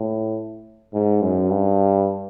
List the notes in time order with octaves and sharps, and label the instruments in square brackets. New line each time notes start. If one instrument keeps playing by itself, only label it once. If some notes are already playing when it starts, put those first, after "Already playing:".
Already playing: [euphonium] A2
G#2
F#2
G2